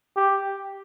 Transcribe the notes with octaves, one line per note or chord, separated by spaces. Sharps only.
G4